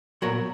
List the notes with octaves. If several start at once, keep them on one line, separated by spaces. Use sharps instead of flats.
A#2 F#3 B3 F#4 A#4